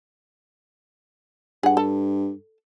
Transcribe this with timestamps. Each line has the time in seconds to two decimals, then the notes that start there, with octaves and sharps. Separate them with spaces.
1.63 G2 G#4 F#5
1.77 A4